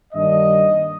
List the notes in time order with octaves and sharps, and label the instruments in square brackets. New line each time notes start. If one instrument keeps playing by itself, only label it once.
[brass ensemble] G2 D#3 G3 A#3 D4 D#5